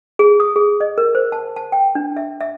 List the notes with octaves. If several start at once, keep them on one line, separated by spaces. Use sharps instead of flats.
G#4
D#6
G#4
D#5
A#4
C5
A5
A5
G5
D4
E5
E5